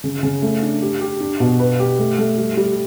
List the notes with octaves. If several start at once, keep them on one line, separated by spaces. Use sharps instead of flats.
C#3
C#3
A3
D4
G4
G4
D4
B2
B4
G4
A3
A3
G3
G3